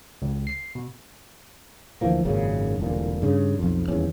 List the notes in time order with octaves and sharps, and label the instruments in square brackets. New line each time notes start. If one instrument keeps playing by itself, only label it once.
[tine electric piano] C#2
C7
B2
[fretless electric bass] D2 E3 F3 A#3
G#1 F#2 A#2 C#3
E1 C2 A#2 D3
G2 C#3
B1 F2
D#1 E2 C#4